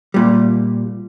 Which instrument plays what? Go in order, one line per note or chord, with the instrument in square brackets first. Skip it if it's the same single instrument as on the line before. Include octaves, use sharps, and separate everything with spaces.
[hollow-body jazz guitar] A#2 G3